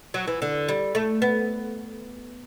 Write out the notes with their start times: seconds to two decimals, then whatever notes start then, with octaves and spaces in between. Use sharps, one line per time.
0.14 F#3
0.27 E3
0.42 D3
0.69 G3
0.95 A3
1.22 B3